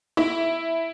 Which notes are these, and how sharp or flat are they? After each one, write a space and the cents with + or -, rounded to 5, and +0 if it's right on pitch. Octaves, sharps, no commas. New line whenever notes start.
E4 +0 E5 +0